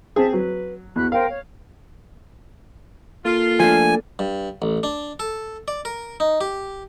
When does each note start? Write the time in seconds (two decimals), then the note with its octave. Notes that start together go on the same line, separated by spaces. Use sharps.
0.16 C4 G#4 E5 A5
0.33 F#3 B4
0.96 E2 F#4 B5 F#6
1.12 A#4 C5 F5 G5
1.29 C#5
3.25 A#3 F4 A4
3.60 F3 A3 D4 G#5
4.19 G2
4.62 A1
4.83 D4
5.20 A4
5.68 D5
5.85 A#4
6.20 D#4
6.41 G4